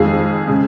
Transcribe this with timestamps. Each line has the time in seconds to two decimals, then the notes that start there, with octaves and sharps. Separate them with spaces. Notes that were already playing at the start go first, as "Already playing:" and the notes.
Already playing: F2 D#3 G#3 F4 G#4
0.47 C#3 G#3